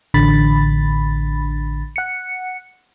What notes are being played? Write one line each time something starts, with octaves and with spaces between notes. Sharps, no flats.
A1 D3 B5 A6
F#5 C#7